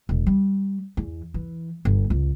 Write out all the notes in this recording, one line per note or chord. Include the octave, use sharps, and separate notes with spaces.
E1
G3
E2
E3
G1
C#2